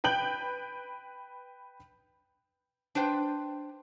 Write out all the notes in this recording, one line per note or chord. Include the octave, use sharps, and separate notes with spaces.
B4 G5 G6 F#7
D4 B4 C5 G5